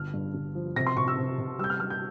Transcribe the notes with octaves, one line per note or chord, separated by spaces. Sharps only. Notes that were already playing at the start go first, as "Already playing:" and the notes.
Already playing: G1 F6
G2
G1
F3
C3 A#6
C6
C3 C#6
E6
C3
C3
G3 E6 G6
F6
G3 F6
G6